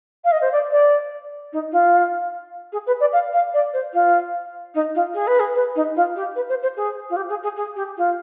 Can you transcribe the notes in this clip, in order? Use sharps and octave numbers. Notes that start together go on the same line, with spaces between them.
F5
D#5
C5
D5
D5
D#4
F4
G#4
B4
D5
F5
F5
D5
C5
F4
D#4
F4
G#4
B4
G#4
B4
D#4
F4
G4
B4
C5
C5
G#4
F4
G4
G#4
G#4
G#4
G4
F4